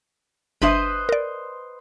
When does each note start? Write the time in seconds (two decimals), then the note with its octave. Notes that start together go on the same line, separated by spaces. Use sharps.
0.62 G1 D4 B4 C5 D#5 E5
1.09 A#4 D5